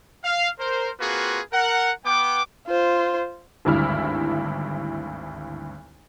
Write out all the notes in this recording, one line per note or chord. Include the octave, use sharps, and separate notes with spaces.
F5
A#4 C5
A#3 C4 F4 F#4 G#4 B4
A#4 F#5
B3 G5 D6
F4 C5
G#1 D2 G2 E4 F6